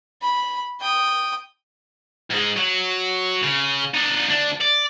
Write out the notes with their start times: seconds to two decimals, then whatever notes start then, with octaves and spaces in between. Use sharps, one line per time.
0.22 B5
0.81 G5 D#6
2.31 G#2 G#3
2.57 F#3
3.43 C#3
3.94 D4 D#4
4.28 D2 D4
4.61 D5